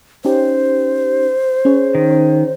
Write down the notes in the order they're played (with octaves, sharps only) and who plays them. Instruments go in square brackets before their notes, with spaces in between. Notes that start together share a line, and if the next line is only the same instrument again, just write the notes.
[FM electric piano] C#4 D#4 G4 [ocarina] C5
[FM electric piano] C#4 G#4 C#5
[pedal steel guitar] D#3